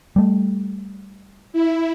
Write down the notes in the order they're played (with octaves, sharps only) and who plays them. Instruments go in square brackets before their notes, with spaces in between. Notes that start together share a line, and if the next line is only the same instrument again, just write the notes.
[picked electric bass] G3 A3
[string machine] E4